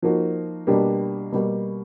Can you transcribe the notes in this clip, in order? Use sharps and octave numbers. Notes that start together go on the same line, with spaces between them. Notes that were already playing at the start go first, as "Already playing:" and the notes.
F3 A#3 D#4 F#4
B2 G3 A#3 D4 G4
B2 G3 A#3